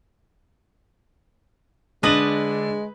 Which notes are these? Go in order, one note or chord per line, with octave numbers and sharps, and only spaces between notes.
D3 G#3 D4 B4 D#5 F#7